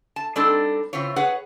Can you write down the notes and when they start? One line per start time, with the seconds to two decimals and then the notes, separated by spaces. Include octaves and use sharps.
0.16 A5
0.36 G3 C4 D4 D#4 A4 A5
0.93 C#3 E3 C4 F4 C#5
1.16 G#4 B4 C#5 F#5